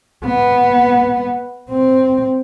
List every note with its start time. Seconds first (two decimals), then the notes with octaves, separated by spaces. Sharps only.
0.25 B3
1.70 C4